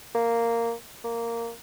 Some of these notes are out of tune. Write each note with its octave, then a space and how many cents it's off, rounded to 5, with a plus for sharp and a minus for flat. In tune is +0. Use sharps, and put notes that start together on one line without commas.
A#3 -10
A#3 -10